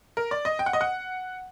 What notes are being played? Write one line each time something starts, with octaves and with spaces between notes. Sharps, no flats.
A#4
D5
D#5
G5
F#5
D#5
F#5